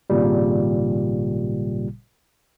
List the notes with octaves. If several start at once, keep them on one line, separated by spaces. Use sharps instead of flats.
G#1 A#2 C#3 G3